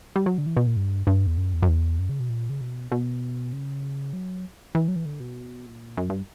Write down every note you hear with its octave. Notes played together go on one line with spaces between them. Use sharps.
G3
F#3
D3
E3
B2
A#2
G2
G2
E2
F#2
E2
F#2
E2
F#2
C#3
B2
A#2
C#3
B2
B2
C#3
F#3
E3
F#3
E3
D3
B2
A#2
F#2
G2